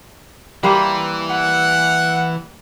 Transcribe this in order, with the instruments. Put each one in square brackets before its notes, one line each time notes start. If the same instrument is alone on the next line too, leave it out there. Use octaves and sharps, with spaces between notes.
[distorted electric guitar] E3 [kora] G3 A#3 C5
[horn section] F#5